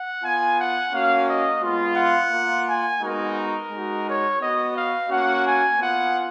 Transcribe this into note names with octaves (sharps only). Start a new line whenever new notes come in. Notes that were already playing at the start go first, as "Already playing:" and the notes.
Already playing: F#5
B3 F4 G#5
F#5
A#3 C#4 F#4 F5
D#5
G#3 B3 F4
F#5
A#3 F4
G#5
G#3 B3 D#4 F#4 A#4
G#3 D#4 F#4
C#5
B3 F#4 D#5
F5
A#3 C#4 F#4 F#5
G#5
B3 F4 F#5